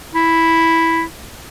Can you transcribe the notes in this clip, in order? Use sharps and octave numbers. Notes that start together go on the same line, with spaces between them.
E4